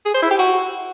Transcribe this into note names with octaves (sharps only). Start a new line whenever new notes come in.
G#4
C5
E4
G4
F#4